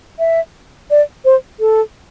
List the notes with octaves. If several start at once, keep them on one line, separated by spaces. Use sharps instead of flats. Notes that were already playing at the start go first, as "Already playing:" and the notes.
E5
D5
C5
A4